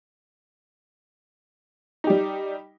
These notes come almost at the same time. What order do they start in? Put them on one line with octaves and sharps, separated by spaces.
D#4 G4 G3